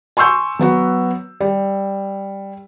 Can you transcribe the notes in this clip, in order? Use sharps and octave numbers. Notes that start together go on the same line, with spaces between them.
G#5 C6 C#6 E6 G6
F#3 B3 F#4
G3